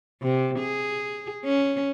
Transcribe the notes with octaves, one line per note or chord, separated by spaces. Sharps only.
C3
G#4
C#4